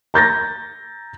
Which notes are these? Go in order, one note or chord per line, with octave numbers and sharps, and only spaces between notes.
A#5 G6 A6 A#6